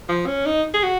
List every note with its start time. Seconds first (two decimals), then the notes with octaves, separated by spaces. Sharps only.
0.09 F3
0.26 C#4
0.46 D#4
0.74 G#4
0.83 F#4